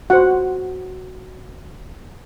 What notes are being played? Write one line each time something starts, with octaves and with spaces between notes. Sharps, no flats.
F#4 C5 F#5